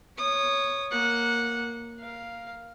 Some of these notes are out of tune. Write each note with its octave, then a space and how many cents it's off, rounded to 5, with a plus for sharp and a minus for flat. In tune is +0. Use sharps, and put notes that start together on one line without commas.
C#5 +0 D#6 -20
A#3 +0 F#5 -15
A#4 +15 F5 +0